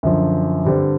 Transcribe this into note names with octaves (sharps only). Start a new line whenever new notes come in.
F#2 D3 F3
G2 D3 G3 C4